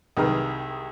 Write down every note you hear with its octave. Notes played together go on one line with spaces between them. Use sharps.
C2 D#3 G#4 B4 A#5 F6